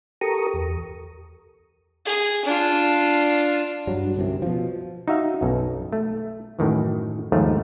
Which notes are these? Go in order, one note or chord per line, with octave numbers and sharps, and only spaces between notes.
G4 A4 A#4 A#5 C#6 D#6
E2
G#4
D4 F4
G2 F#3
G1 C2 F#2 C3
B2 F3
D#4 F#4 E5 F5
B1 F#2
A3
F#2 A2 D#3 E3
D#2 G#2 D#3 F3 A3